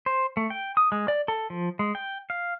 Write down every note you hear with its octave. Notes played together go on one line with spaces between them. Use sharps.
C5
A3
G5
D#6
G#3
D5
A4
F3
G#3
G5
F5